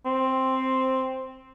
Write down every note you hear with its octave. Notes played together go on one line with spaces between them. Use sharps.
C4